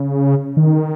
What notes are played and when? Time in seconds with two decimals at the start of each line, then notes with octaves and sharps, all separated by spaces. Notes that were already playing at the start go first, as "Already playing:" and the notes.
Already playing: C#3
0.57 D#3